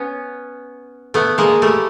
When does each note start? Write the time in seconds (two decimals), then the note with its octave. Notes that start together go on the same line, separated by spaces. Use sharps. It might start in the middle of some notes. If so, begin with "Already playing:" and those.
Already playing: B3 C#4
1.14 A3 B3
1.38 G#3 A#3
1.62 G3 A3